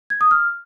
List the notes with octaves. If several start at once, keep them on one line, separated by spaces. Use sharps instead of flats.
G#6
D#6
F6